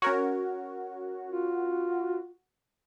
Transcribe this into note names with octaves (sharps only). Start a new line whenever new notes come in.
C#4 F#4 A#4 C#5
F4